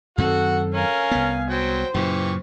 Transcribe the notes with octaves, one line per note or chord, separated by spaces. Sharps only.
F#2 D#3 C4 F#4 A4 F#5
C#4 A#4 F5 G#5
C2 B3
F#3 C5 G5
F#2 A#2 C#3 E3 G4 C#6